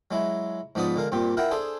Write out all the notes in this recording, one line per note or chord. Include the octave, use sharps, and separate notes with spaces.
F#3 G#3 E4
G#2 F3 B3 D5 B5 D#6
D3 G#3 A#4 F5
G2 A#2 C4 G4
E4 A#4 F#5 G5
D4 G#4 A4 C5